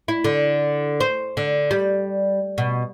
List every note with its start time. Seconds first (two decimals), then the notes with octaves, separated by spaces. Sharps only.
0.08 E4
0.24 D3
1.00 C5
1.37 D3
1.71 G3
2.58 B2